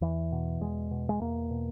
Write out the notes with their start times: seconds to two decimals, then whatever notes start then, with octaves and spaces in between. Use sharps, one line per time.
0.01 E2 E3
0.32 B2
0.61 E2 G#3
0.91 B2
1.09 G#3
1.21 E2 A#3
1.51 B2